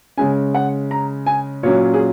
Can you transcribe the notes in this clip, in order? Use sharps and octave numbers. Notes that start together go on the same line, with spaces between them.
C#3 G#3 C#4 G#5
F#5
A#5
G#5
A#2 F#3 C#4 C#5
G#4